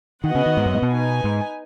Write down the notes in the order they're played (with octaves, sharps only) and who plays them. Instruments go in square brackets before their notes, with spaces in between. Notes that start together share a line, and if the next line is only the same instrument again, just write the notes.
[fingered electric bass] D#3 [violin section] B3 F#4 D#5 F#5
[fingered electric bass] C#3
D#3
G#2
F#2
G#2
B2
[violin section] D#4 B4 G#5
[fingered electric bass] G#2